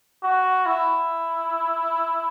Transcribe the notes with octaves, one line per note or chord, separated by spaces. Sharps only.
F#4
E4